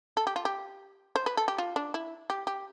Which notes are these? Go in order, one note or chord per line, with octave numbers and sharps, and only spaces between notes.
A4
G4
F4
G4
C5
B4
A4
G4
F4
D4
E4
G4
G4